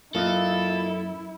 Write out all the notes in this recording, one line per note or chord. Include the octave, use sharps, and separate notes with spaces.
F#2 A#3 E4 F4 A4 D#5